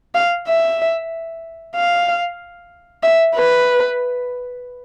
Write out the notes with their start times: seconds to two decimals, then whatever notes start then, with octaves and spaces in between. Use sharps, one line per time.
0.15 F5
0.48 E5
1.75 F5
3.03 E5
3.35 B4